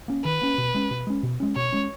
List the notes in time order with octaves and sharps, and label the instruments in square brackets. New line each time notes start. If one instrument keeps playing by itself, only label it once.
[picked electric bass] A#3 C#4
[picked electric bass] D#3 [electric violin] B4
[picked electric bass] A#3 C#4
B2
G#3 C#4
B2
G#3 C#4
B2
G#3 C#4
[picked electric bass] B2 [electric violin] C#5
[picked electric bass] G#3 C#4